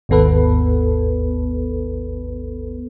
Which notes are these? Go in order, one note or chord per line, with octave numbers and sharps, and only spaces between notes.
G#1 D#2 B3 A4 B4